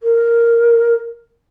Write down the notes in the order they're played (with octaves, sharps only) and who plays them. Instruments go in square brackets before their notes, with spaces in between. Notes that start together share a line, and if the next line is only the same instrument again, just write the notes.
[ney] A#4